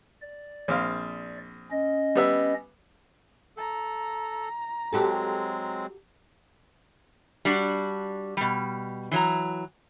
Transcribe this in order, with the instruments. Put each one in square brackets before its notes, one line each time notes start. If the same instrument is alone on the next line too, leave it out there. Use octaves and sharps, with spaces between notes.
[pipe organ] D5
[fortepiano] A#1 C4 F5
[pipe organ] C#4 D#5
[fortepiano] G3 B3 E5
[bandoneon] A4 [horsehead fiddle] A#5
[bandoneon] F#3 G#3 C4 [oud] F#4 G4 A4
[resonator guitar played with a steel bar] G3 D4 F#4
B2 G3
E3 F#3 A#5